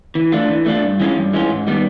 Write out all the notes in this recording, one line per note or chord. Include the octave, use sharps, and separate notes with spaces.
E3
A3 D4 F4
E3
A3 D4 F4
G2
E3 G#3 C#4 F4
G2
E3 G#3 C#4 F4
G#2
D#3 G3 B3